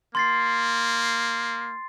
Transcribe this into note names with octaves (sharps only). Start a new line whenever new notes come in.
A#3 C6 A6 C7